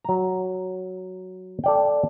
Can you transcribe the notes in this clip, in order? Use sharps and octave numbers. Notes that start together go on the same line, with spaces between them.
F#3 A#5
A4 D5 G5